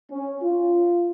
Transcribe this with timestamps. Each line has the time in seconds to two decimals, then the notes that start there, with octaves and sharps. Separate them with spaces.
0.10 C#4
0.42 F4